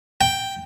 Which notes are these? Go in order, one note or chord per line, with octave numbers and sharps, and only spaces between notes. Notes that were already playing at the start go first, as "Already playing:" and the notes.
G5